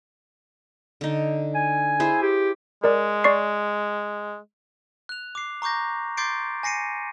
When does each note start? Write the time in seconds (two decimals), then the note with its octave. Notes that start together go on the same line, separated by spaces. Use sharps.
1.01 D3 D#4
1.55 G#5
2.00 E4 G#4 C5
2.22 G4
2.84 G#3 A#4 D5
3.24 D5 C#6 C7
5.09 F#6 F7
5.35 D6 C7
5.62 A#5 C#6 D6 G6 A#6
6.17 C6 D6 G6 A6 C7 D7
6.63 G#5 A#6 C7 C#7 D#7